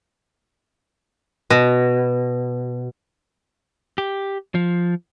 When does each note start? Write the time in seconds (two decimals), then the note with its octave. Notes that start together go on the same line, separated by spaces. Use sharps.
1.50 B2
3.98 G4
4.55 F3